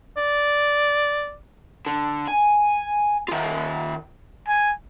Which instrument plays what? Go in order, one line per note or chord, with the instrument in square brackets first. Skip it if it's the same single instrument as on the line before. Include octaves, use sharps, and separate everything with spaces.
[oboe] D5
[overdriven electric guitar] D3
G#5
D#3 F4
[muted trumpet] G#5